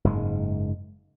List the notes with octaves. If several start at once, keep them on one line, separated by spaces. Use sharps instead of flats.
F#1 G#2 G#3